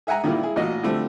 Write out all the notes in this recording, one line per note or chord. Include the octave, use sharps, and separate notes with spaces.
G#4 E5 F#5 G#5 A#5
A#2 D#3 G3 A#3 E4
E4 G#4
A1 A#2 E3 F#4 D#5
D3 F3 G3 A3 C4